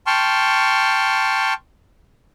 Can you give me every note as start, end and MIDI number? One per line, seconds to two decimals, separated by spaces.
0.07 1.53 79
0.07 1.53 81
0.07 1.53 84
0.07 1.53 85
0.07 1.53 89